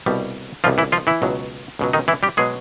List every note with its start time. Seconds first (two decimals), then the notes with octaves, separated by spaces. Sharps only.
0.06 C2 B2 G3
0.64 C2 B2 F3 G3 F4
0.78 E3 E4
0.92 F3 F4
1.07 E3 E4
1.22 C#2 B2 F#3
1.79 C#2 B2 F#3
1.93 D#3 D#4
2.08 E3 E4
2.23 G3 G4
2.37 B2 F#3 G#3 G#4